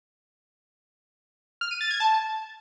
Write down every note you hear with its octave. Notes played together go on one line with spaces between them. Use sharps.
F6
D#7
A6
G#6
A5